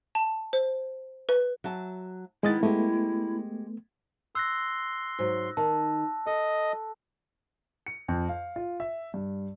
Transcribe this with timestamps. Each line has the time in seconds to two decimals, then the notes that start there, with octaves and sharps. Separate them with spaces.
0.15 A5
0.53 C5
1.29 B4
1.64 F#3 E5 A5
2.43 D#3 G#3 B3 E4 D#5 A6
2.63 G#3 A3 B3 G4
4.35 C6 E6 F#6 A#6
5.19 G#2 F#3
5.57 D#3 A5
6.26 A4 D#5
7.87 C#7
8.08 F2
8.29 F5
8.56 F4
8.80 E5
9.14 G2